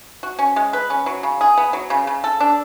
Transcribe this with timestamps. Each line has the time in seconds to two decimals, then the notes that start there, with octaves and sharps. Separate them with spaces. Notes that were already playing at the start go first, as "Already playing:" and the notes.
0.23 F#4
0.39 C#4
0.56 G#3
0.73 B4
0.90 C#4
1.06 F#3
1.23 C#3
1.41 G#4
1.58 B3
1.73 F#3
1.90 C#3
2.07 C#3
2.24 A4
2.40 D4